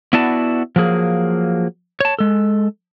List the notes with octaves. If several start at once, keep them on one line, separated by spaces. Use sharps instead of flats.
B3 E4 F#4 D5 A5
F3 F#3 A#3 G#4
C#5 A5
G#3 A4